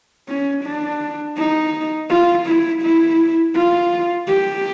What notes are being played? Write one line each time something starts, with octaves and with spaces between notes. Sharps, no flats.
C#4
D4
D#4
F4
E4
E4
F4
G4